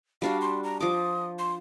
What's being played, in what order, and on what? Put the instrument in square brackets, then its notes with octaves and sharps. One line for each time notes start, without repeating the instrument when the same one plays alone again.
[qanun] G3 D4 F#4 [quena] F5
[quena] C6
A#5
[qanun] F3 D6 [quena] D#6
[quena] C6